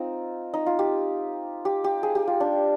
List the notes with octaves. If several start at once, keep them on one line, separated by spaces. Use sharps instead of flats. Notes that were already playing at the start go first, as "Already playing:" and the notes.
Already playing: C4 D#4 F4
D#4
F4
G4
G4
G4
G#4
G4
F4
D4